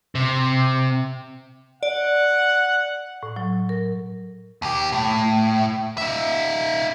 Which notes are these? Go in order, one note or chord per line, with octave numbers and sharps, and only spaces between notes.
C3
D5 F#5
A2
F#3
A#4
D#2 G4
A2
D#4 E5